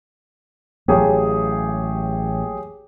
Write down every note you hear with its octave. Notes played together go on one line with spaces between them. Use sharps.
A1 F#3 A#3 G4 G#4 C#5